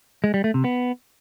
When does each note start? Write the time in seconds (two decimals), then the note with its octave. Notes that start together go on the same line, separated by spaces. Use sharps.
0.24 G#3
0.34 G3
0.44 A3
0.54 C3
0.64 B3